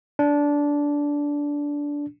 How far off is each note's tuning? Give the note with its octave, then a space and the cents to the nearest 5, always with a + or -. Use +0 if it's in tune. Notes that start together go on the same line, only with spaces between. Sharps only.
D4 -15